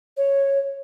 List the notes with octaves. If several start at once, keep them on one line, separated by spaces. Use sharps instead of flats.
C#5